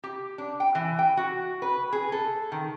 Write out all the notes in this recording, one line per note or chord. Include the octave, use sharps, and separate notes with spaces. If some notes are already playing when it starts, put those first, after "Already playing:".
G4
D4
G5
E3
G5
F#4
B4
G#4
A4
D#3